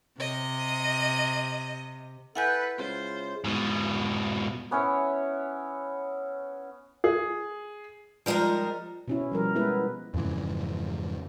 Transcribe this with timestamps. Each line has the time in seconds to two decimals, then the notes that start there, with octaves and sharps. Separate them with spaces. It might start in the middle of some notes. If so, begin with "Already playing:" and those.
0.20 C3 D#5
2.35 E4 A4 B4 E5 F#5 G#5 G6
2.78 C#3 G#3 F4 C5
3.44 G#2 B2
4.71 B3 C#4 E4 C#5
7.04 G#4
8.26 F3 G3 G#3 D#4 A#4
9.08 B2 C#4 E4
9.32 F3 G3 A#4
9.55 G#3 B3 E4 B4
10.14 F2 G#2 C#3 E3